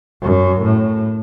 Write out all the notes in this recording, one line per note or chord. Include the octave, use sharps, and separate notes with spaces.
F#2
A2